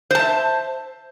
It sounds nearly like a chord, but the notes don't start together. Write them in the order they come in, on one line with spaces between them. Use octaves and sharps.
C5 A5 E5